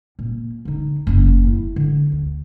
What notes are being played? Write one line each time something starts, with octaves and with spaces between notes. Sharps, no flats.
A#2
D3 D#4
F#1 E2
A3 E4
D3
D2